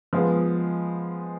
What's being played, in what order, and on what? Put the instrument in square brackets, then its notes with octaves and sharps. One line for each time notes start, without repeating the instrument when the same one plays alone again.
[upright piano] F3 G#3 B3